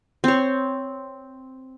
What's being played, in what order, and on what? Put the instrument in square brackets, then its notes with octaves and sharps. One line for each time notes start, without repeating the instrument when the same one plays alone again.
[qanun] C4 C#5